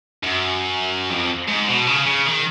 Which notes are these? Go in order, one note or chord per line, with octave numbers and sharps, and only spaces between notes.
F#2
F2
G#2
B2
C#3
C#3
D#3